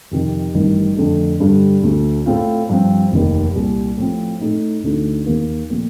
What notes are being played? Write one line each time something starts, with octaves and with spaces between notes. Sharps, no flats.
F2 C3 D#3
A1 G2 D#3
F2 D3 A3
G2 D3 G3
D2 D3 A3
A2 A3 C4 F4
G2 F3 C4
F1 D#2 D#3 A#3
C2 A#2 G3
A2 F3 C4 F4
A2 A3 D#4
D2 D3 A3 D#4
D#2 D#3 A#3
A#2 F3 A3 C4